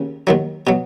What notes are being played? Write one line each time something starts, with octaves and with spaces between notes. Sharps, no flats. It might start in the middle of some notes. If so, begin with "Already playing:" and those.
Already playing: D#2 C#3
D#2 D#3 F#3
B2 F#3